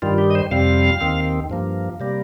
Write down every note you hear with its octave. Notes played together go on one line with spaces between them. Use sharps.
G2 D#3 G3 F4
G4
D#5
C5
F2 C3 G3 C4 F5
D#2 D#3 C4
G2 F3 A#3
C3 G3 A#3